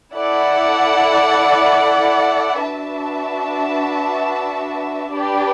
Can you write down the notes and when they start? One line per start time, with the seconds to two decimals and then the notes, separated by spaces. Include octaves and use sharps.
0.14 E4 A4 D5 F#5
2.63 D4 F#4 B4 E5 A5
5.12 D4 G4 B4 D5